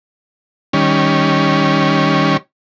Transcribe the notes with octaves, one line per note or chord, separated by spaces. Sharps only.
D#3 G3 C#4